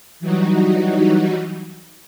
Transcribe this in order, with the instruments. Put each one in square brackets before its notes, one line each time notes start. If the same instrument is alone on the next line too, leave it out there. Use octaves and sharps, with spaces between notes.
[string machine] E3 F#3 G3 D#4 F#4